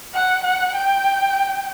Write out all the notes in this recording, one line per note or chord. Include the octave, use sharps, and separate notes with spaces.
F#5
F#5
G5